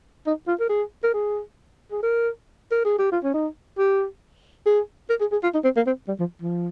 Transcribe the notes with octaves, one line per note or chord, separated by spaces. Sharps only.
D#4
F4
A#4
G#4
A#4
G#4
G#4
A#4
A#4
G#4
G4
F4
C#4
D#4
G4
G#4
A#4
G#4
G#4
F4
D#4
C4
A#3
C4
G3
F3
F3